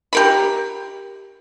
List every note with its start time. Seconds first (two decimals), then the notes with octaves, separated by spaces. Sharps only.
0.13 G4 A#4 B5